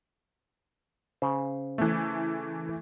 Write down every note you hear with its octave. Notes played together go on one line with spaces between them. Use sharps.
C#3 C5
E3 A3